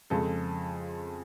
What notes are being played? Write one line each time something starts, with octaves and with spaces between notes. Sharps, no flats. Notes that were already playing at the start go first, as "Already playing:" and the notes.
F2 C#3 F3 G#3 A4